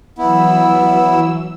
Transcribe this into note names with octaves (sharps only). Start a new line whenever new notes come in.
E3 F#3 B3 E4 E6